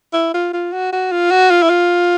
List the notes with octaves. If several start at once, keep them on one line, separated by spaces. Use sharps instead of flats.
E4
F4
F4
F#4
F#4
F4
F#4
F4
E4
F4